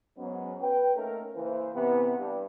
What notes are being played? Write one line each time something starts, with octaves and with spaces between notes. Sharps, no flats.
G#2 F#3 B3 C#4
B4 G5
A3 A#3 C#4 D#4 A#4
C#3 E3 A#3 C5
C3 E3 B3
G2